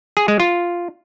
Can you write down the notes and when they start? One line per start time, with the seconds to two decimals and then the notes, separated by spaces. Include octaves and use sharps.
0.17 G#4
0.28 G#3
0.40 F4